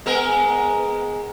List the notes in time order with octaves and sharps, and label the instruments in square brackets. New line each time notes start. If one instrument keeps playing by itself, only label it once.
[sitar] G#3 B3 A#4